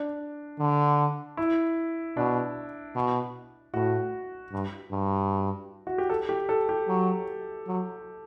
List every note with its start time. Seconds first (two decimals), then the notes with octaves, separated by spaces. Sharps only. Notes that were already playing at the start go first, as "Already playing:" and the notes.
Already playing: D4
0.59 D3
1.37 E4
2.17 B2 D4
2.96 B2
3.74 A2 F#4
4.52 G2
4.91 G2
5.87 F#4
5.98 G4
6.09 A4
6.29 G4
6.49 A4
6.69 G4
6.88 F#3
7.67 F#3